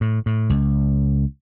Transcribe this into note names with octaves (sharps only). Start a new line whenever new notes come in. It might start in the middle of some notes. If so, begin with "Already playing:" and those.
A2
A2
C#2